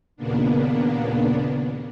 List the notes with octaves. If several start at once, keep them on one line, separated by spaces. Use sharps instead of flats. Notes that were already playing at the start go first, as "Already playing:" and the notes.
D#2 A#2 C#3 A#3 B3 D4